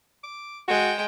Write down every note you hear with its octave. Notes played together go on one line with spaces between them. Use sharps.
D6
G#3 F#4 G5